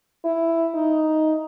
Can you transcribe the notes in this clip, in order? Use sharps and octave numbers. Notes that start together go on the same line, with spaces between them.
E4
D#4